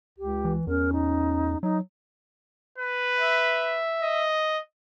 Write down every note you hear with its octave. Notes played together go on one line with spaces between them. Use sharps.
C#2 G4
E3
E2 C#4 A#4
D#4
F#3 D#4
B4
E5
D#5